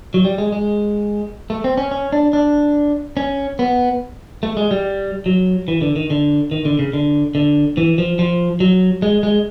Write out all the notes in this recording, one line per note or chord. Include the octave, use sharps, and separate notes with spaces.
F#3
G3
G#3
G#3
A3
C4
C#4
C#4
D4
D4
C#4
B3
A3
G#3
G3
F#3
E3
D3
D#3
D3
D#3
D3
C#3
D3
D3
E3
F3
F3
F#3
G#3
G#3